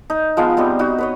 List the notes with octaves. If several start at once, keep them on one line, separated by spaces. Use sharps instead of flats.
D#4
F3 G#3 B3 F5
G3 B3 C4 D#4
D#4 F#4
B4 C#5 D#5